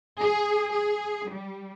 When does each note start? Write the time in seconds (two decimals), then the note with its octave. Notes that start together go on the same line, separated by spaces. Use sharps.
0.20 G#4
0.69 G#4
1.30 G3